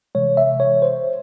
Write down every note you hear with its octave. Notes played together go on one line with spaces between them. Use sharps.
C3 E3 G#3 C#5
E5
C#5
C5